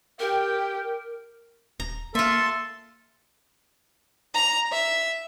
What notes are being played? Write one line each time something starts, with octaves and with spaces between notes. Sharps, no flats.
G4 A#4 G5
D#1 A#5
A#3 F4 A4 E5 C6
A#5
E5